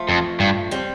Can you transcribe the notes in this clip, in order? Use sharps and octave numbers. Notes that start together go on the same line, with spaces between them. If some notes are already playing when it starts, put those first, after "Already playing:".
Already playing: F3 A3
F2
G2
G3 C4